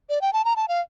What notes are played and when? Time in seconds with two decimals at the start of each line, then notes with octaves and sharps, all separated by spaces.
0.09 D5
0.21 G5
0.33 A5
0.45 A#5
0.56 A5
0.68 F5